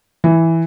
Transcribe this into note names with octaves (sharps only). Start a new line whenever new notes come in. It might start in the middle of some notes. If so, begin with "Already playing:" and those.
E3